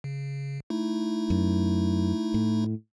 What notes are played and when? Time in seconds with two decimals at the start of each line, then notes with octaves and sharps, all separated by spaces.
0.04 C#3
0.70 A3 D#4 E4
1.30 F#2
2.34 A2